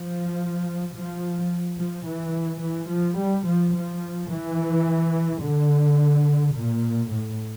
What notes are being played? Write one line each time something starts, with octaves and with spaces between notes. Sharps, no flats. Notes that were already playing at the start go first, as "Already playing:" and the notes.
Already playing: F3
F3
F3
E3
E3
F3
G3
F3
F3
E3
D3
A#2
A2